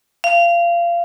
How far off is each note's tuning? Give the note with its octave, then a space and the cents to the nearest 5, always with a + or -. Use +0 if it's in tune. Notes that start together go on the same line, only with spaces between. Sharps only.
F5 -25